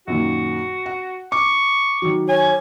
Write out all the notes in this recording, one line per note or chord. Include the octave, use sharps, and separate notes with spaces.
F#2 A#2 D#3 F#4
F#5
C#6 D6
D#3 F#3
C#5 G#5